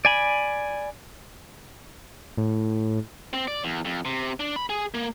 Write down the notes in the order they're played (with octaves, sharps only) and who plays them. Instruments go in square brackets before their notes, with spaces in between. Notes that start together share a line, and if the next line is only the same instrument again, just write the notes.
[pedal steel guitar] D5 G#5 B5
[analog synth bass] A2
[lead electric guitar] C4
D5
E2
F2
C3
D4
B5
G#4
A#3